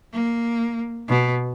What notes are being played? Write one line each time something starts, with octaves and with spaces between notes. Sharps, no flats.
A#3
B2